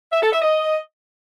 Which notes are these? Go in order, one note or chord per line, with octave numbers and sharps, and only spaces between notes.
E5
A4
E5
D#5